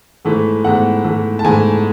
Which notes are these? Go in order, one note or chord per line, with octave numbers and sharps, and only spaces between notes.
G#2 E3 A3
G#2 E3 A3 F#5
G#2 E3 A3
A5
G#2 E3 A3 G#5